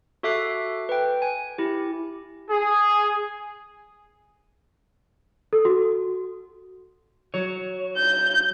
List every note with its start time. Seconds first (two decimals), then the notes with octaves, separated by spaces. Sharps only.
0.23 F#4 A4 E5 D6 F#6 C7
0.89 B4 G5
1.22 G#5
1.58 E4 G4
2.50 G#4
5.53 A4
5.65 F#4
7.34 F#3 C#5
7.97 G6